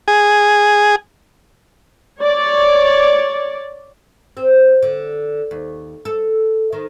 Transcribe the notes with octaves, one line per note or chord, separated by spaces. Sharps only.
G#4
C#5 D5
C4
D3
D#2
A4
D#3